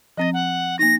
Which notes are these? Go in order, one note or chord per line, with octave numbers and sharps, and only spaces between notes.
F3 C4 D#5 A6
F#5
A#3 D#4 A#6